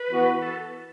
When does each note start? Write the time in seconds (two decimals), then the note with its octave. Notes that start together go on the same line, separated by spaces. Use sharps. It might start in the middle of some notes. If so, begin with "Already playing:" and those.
Already playing: B4
0.10 E3 B3 F#4
0.42 A4